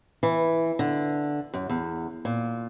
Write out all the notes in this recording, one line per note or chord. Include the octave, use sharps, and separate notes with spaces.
E3
D3
F#2
E2
A#2